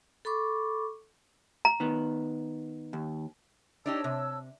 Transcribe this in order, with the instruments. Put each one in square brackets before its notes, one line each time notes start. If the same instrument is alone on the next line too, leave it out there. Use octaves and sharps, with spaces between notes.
[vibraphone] A4 B5 C#6 D6
[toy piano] A#5
[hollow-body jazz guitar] D#3 B3
D#2
[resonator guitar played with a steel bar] D4 D#4 G4 [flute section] C#5 A5 E6
[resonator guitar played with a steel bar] C3